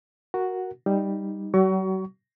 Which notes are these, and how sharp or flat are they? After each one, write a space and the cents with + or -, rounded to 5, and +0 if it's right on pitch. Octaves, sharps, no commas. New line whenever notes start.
F#4 +0 A#4 +0 F#5 +0
G3 +5 D#4 +0
F#3 +45 F#4 +30 C#6 +25